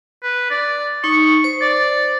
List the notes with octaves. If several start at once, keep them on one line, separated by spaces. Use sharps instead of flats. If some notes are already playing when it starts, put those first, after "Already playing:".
B4
D5
D#4 C#6
C5
D5